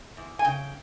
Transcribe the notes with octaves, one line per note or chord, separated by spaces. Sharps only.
E2
G#5
C#3 G5